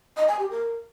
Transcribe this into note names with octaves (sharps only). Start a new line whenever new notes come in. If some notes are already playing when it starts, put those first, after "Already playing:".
D#5
G#5
G4
A#4